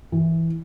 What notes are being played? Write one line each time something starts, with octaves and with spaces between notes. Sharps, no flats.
E3